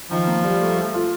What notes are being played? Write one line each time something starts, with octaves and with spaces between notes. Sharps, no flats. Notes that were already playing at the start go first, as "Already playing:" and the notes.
D#3 F3
A#3
G3
A3
A4
F4